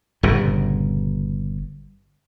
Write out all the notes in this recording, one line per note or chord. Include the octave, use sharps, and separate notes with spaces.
G1 A#2 C#3